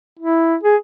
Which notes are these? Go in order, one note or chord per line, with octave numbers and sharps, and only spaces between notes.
E4
G#4